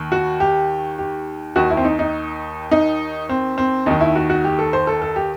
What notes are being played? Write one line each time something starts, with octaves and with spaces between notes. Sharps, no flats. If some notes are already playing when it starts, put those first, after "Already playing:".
Already playing: D#2 D#3
F#4
G4
G4
D#2 D#3 F#4
E4
C4
D#4
D#4
D#4
C4
C4
D#2 D#3 D#4
E4
F#4
F#4
G4
A4
C5
A4
A4
G4